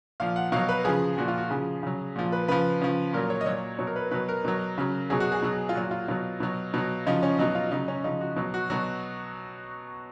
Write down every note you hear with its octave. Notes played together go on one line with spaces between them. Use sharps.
A#2 F3 F5
F#5
B2 F#3 F5
B4
C#3 F3 G#4
A#2 F3 F#4
F4
F#4
C#3 F3 G#4
C#3 F#3
A#2 F3
B4
C#3 F3 B4
C#3 F3
A#2 F#3 A#4
C#5
D#5
A#2 F#3 C#5
B2 F#3 C#5
A#4
B4
B2 F#3 B4
A#4
B2 F#3
C#3 F#3
B2 F#3 G#4
F#4
G#4
B2 F#3
F4
A#2 F#3 F#4
F4
B2 F#3 F4
B2 F#3
B2 F#3
C#3 F3 D#4
C#4
B2 F#3 D#4
F4
C#3 F#3 D#4
C#4
C#3 F3 D#4
F#4
B2 F#3
F#4
B2 F#3 F#4